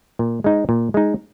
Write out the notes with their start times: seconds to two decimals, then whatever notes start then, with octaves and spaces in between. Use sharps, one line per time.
0.19 A#2
0.44 G#3 D#4
0.69 A#2
0.94 G#3 D#4